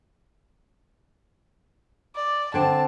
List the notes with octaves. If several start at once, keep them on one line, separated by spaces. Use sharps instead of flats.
D5
D3 C4 A5